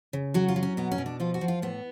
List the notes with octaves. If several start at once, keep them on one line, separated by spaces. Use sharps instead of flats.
C#3
F#3 F#4
F4
F#3
C#4
B2 B3
C#4
B2
D4
F3 F4
F#4
F3
F4
A2 B3